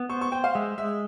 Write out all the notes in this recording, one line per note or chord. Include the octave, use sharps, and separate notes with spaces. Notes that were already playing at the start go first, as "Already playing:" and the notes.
Already playing: B3
C5 C#6
C#6
C5 G5
F5
G#3 E5
G#3 E5